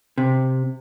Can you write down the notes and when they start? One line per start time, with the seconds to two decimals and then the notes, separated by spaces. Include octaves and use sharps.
0.18 C3